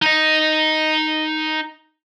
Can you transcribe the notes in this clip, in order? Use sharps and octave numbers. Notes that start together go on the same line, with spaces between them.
D#4 D#5